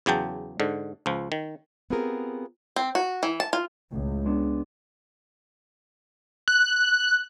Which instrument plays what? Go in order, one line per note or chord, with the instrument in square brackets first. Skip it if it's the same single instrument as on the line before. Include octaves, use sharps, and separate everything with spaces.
[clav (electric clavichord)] E2 C#3 F#3 G5 A5
G#2 D3
C#2 F3
D#3
[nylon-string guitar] B3 C4 F4 G4 G#4 A#4
[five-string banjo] C4
F#4
E3
A5
F4
[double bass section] C#2 [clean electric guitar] A2
[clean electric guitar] G#3 B3 D4
[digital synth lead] F#6